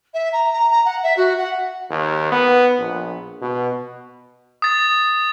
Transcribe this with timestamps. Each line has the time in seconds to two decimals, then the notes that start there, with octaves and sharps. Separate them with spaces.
0.14 E5
0.32 A#5
0.53 A#5
0.70 A#5
0.85 F#5
1.03 E5
1.17 F#4
1.38 F#5
1.90 D#2
2.32 B3
2.79 A#1
3.42 B2
4.62 D#6 A6